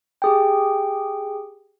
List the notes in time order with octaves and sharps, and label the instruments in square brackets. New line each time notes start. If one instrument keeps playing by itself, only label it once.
[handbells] G4 G#4 G5